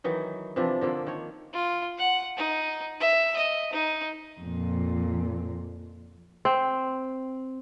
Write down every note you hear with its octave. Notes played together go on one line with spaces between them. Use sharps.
D#3 E3 F#3 D#4
C3 E3 F3 D4
D3 F3 A#3
D#3 C#5
F4
F#5
D#4
E5
D#5
D#4
F2 A#2
C4